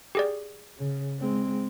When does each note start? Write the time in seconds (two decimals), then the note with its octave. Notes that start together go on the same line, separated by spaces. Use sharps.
0.15 G4 G#4 D5
0.78 C#3
1.20 G#3 C4